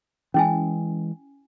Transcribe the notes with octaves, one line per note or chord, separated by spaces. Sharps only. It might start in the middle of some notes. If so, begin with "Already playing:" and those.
E3 G#3 C#4 E4 G#5